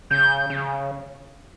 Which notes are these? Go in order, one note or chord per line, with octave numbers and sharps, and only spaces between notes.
C#3 G6
C#3